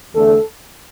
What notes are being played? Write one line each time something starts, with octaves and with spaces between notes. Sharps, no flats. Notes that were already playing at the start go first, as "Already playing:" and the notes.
E2 D3 A3 A4